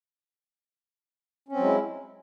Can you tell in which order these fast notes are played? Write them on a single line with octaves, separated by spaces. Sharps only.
C#4 C4 F#3 G#3 E4